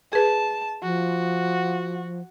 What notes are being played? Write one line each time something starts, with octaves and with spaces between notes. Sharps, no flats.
G#4 B4 A5
F3 F#4